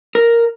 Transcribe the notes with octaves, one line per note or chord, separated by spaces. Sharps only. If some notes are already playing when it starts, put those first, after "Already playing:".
A#4